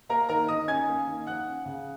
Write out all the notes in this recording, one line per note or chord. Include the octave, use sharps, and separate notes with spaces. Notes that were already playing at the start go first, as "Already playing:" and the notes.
A#3 A#4 A#5
D#3 A#4 A#5
D#3 D#5 D#6
C#4 G#5 G#6
A#3
D#3
F3 F#5 F#6
C#4
C#3